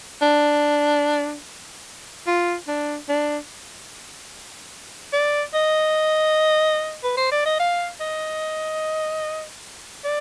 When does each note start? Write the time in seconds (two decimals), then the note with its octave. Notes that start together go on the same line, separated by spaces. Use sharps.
0.21 D4
2.27 F4
2.68 D4
3.09 D4
5.13 D5
5.54 D#5
7.04 B4
7.17 C5
7.31 D5
7.45 D#5
7.59 F5
8.00 D#5
10.05 D5